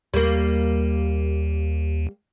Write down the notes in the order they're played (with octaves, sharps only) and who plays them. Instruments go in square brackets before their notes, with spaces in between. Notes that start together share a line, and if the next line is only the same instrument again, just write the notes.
[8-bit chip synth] D#2 [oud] G3 A#3